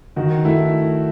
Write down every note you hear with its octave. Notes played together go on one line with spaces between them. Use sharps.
D#3 F#4
A3 E4